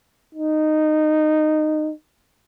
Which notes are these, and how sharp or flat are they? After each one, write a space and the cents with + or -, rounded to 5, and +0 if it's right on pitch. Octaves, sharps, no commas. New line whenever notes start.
D#4 -15